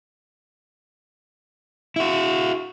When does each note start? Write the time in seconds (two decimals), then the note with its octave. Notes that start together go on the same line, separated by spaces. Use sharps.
1.96 E4 F#4